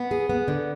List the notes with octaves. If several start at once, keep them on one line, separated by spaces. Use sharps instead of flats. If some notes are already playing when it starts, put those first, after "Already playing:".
Already playing: B3
G#4
B3
D3